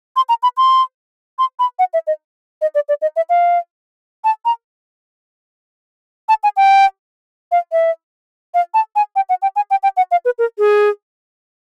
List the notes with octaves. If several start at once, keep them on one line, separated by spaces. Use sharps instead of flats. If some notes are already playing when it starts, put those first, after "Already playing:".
C6
A#5
B5
C6
C6
B5
F#5
E5
D#5
D#5
D5
D5
D#5
E5
F5
A5
A#5
A5
G#5
G5
F5
E5
F5
A5
G#5
G5
F#5
G5
G#5
G5
G5
F#5
F5
B4
A#4
G#4